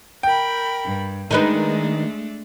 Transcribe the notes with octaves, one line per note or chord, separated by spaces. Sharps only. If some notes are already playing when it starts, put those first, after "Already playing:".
A#4 G5 B5
G2
D#3 G#3 A3 D4 D#4 B4